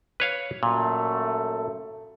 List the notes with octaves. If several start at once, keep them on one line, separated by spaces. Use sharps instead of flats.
B4 C#5 F5
F#2 A#2 A3